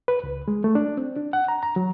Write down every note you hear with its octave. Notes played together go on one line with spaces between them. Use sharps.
B4
C#2
G#3
A3
D4
C4
D4
F#5
A#5
A#5
F#3